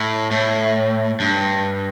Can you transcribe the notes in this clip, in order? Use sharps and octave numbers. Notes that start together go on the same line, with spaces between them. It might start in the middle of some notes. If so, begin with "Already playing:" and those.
Already playing: A2
A2
G2